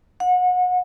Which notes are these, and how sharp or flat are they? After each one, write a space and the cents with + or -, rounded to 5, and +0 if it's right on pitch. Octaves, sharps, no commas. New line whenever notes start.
F#5 -30